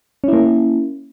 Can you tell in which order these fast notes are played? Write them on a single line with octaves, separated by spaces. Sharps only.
C#4 E4 A#3